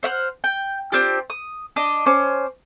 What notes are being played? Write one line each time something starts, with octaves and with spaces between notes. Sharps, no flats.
C5 E5 F#5 F6
G5
C4 D4 F4 G4
D#6
D4 D#5
C#4 C5 D6